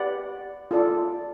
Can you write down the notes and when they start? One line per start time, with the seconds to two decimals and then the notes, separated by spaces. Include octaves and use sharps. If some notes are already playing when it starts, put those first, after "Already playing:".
Already playing: G4 B4 D5 F#5
0.71 F4 A4 D5